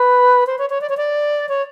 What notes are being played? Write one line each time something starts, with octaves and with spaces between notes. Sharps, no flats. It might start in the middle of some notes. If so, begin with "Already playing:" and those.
Already playing: B4
C5
C#5
C#5
D5
C#5
D5
C#5